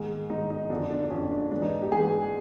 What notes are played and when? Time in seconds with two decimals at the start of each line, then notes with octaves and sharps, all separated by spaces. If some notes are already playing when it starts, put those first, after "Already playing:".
Already playing: G#2 D#3 G#4
0.30 G#2 D#3 D#4
0.50 D#4
0.70 F2 D3 F3 D4
0.91 D4
1.03 D4
1.10 F2 D3 F3 C#4
1.31 D4
1.51 G#2 E3 D4
1.62 D#4
1.82 G4
1.91 G#2 E3 G#4